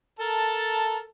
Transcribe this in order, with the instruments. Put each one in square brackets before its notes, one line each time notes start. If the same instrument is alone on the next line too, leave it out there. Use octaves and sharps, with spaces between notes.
[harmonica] A4 A#4 A5